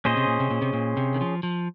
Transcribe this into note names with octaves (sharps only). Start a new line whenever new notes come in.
A#2 C#4 G#4 C5 D#5
C3
A#2
C3
A#2
C3
A#2
C3
D#3
F3
F3